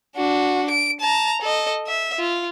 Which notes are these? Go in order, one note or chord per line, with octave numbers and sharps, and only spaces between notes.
D4 F#4
D7
A5 A#5
A4 D#5
E5
F4